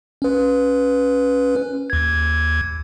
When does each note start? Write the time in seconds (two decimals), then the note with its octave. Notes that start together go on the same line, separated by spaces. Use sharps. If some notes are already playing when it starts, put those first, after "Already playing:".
0.22 C#4 B4
1.90 D#2 G#6